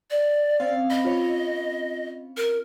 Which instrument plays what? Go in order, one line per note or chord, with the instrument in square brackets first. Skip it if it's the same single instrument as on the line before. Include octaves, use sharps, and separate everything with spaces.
[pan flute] D5
[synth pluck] C4 C#4 F5
[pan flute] D#5 [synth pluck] B5
[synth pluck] F4 C#5
[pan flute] A#4